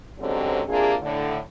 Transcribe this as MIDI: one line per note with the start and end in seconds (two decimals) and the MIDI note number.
0.20 0.62 44
0.20 0.62 50
0.20 0.62 54
0.20 0.62 60
0.20 0.62 61
0.20 0.62 67
0.69 0.96 48
0.69 0.96 58
0.69 0.96 62
0.69 0.96 65
0.69 0.96 68
1.02 1.38 45
1.02 1.38 50